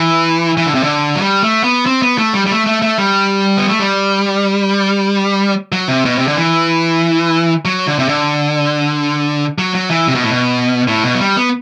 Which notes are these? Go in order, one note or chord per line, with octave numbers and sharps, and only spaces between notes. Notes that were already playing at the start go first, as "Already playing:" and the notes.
Already playing: E3
E3
D3
C3
D3
F#3
G3
A3
B3
C4
B3
A3
G3
G3
A3
A3
A3
G3
B3
A3
G3
F#3
C3
B2
C3
D3
E3
F#3
D3
C3
D3
F#3
F#3
E3
C3
B2
A2
B2
A2
B2
F#3
G3
B3